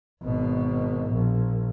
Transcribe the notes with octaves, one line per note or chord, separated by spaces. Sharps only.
G#1 B2
A#1